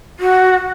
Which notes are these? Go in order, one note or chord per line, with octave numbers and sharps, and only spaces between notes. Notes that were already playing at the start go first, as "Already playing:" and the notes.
F#4